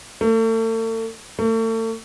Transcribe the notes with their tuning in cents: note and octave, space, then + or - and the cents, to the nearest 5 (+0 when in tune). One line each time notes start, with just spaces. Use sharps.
A3 +40
A3 +40